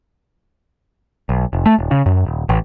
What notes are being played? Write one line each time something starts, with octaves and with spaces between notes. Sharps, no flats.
B1
F1
A3
D#1
C#3
F#2
D#1
A1